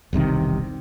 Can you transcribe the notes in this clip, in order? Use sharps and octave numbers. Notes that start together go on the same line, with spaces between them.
E1 C2 C3 D#3